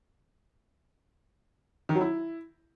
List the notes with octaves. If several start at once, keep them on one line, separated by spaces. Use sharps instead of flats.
D#3
F#3
E4